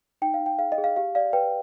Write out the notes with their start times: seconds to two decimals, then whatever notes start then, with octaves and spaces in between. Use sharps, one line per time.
0.22 D#4 G5
0.34 F5
0.40 D#4
0.46 G5
0.59 G#4 F5
0.72 D#5
0.78 G#4
0.84 F5
0.96 G4 F5
1.15 D5 F5
1.33 B4 G5